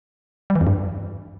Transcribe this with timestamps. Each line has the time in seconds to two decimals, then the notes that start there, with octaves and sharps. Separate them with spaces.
0.50 G3
0.56 E3
0.61 F2
0.67 G2